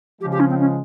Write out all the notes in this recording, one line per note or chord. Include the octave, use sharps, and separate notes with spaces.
C#3 F3 G#3 G4
G4
C#4
C4
C#4